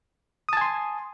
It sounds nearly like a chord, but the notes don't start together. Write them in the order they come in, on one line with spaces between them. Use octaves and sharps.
D#6 A5 G#5 C6